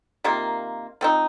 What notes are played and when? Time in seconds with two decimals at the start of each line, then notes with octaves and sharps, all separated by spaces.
0.24 C3 D#3 A#3 F4
1.01 F3 C4 D#4